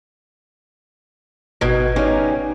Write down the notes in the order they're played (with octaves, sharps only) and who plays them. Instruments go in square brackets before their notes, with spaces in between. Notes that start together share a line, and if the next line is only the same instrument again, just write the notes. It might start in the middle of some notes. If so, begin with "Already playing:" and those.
[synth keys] G#1 G#6 D7 [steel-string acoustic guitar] B2 D#3
[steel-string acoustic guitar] C#3 G3 C#4 [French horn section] D#4